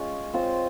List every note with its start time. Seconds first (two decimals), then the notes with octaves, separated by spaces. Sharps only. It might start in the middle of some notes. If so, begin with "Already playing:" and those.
Already playing: G#3 C#4 F4
0.34 C4 F4 C5